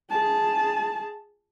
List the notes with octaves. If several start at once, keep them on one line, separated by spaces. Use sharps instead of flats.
G#4 A5